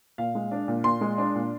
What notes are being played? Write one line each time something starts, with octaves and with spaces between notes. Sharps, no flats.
A#2 F5
G#3
D4
A#2
A#2 C6
G#3
D4
A#2